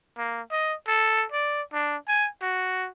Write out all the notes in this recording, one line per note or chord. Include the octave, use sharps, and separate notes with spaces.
A#3
D#5
A4
D5
D4
G#5
F#4